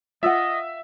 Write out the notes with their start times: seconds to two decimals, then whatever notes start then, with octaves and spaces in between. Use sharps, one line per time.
0.23 F4 D#5 E5 F#5 E6